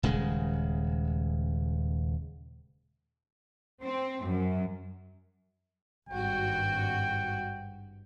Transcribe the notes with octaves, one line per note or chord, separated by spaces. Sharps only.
D#1 C#3 G#3
C4
F#2
G#1 G2 F#4 G5